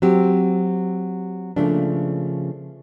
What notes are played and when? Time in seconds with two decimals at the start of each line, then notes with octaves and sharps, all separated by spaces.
0.02 F#3 C4 G4
1.56 C#3 F3 A3 A#3 D4